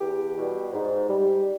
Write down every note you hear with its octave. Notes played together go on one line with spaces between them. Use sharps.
E2 G4
B2 G3
G#2
G3